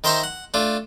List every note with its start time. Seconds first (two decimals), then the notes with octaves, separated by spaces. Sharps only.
0.04 D#3 A#4 C5 E5 C6 C#6
0.23 F#5
0.54 A3 D4 F4